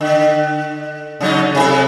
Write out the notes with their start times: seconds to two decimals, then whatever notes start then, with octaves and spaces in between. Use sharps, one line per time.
0.01 D3
1.20 C#3 F#3 D#4
1.55 C3 G#4 A4